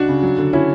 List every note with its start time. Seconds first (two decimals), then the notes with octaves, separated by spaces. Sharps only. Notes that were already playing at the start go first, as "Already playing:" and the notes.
Already playing: C#2 D4 F#4
0.08 C#3
0.23 F#3
0.38 D3
0.53 C#4 E4